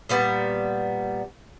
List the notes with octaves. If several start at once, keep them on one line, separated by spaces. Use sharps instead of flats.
A#2 G3 B3